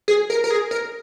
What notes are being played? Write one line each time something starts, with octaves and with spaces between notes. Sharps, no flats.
G#4
A#4
A#4
G#4
A#4